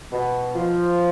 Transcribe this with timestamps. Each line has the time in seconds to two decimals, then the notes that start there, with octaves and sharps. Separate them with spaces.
0.12 B2
0.55 F3